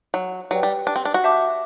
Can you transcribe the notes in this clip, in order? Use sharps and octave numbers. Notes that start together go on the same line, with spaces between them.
F#3
F#3 G4 B4 D5 G5
G3
D4
C4
D4
F#4
E5 A5 D6 G6